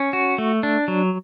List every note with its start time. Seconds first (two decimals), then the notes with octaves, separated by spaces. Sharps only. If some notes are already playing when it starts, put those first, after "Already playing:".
Already playing: C#4
0.13 F#4
0.38 A3
0.63 D4
0.88 F#3